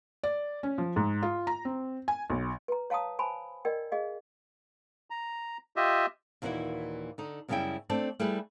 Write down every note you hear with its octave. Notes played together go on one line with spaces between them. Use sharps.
D5
C#4
F3
G#2
F4
A#5
C4
G#5
B1
B4 A#5
C#5 F5 A5 A#5 D#6
C5 G#5 A5 B5
A#4 D5 D#5 G5
G#4 D#5 F5
A#5
F4 G4 D#5 E5
D#2 A#2 E3 C#4 E4 F#4
D3 D#4
F#2 C#3 G3 C#4 E4 G5
A3 C4 D4 D5
G3 A3 E4 G#4 B4